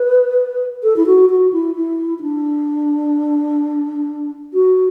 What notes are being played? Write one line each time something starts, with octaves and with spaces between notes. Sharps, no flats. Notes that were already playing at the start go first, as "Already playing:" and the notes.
Already playing: B4
A4
E4
F#4
F#4
E4
E4
E4
D4
F#4